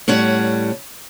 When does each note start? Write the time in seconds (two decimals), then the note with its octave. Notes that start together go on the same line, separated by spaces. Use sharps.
0.08 A2 G3 C#4 C#5 F#5